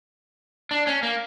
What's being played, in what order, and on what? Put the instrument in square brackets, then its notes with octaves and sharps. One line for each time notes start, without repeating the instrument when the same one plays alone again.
[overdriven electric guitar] D4
C#4
A#3